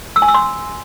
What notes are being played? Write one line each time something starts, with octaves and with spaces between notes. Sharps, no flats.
E6
G#5
E6
C6